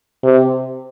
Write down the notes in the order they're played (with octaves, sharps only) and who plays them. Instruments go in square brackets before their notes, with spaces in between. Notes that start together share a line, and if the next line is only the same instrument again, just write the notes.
[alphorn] C3